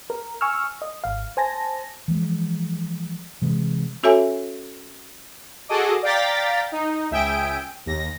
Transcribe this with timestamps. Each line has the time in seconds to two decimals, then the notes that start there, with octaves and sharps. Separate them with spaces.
0.10 A#4
0.41 G#5 C#6 E6 F6
0.82 D#5
1.04 G#1 F5
1.37 C5 G#5 A5 A#6
2.08 E3 F3 G#3
3.42 C3 E3 G#3
4.03 C#4 F#4 A4 C#5 E5 G#5
5.69 F#4 G#4 A4 D#5 D6
6.03 D5 F5 G5 A#5 A6 B6
6.72 D#4
7.11 C#2 E5 G5 G#5 D#6 D7
7.86 D#2 A#6